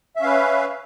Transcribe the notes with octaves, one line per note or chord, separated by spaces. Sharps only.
C#4 B4 E5 F5